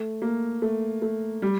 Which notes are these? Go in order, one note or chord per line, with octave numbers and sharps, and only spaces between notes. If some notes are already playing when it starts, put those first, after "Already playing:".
Already playing: A3
A#3
A3
A3
G3